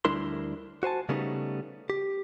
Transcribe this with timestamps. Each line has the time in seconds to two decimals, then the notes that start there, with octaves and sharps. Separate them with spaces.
0.05 D2 G3 D4 E4 A#4 C6
0.83 F#4 C5 G#5 A5
1.09 C#3 G3 A3 B3 C#4 D#4
1.90 G4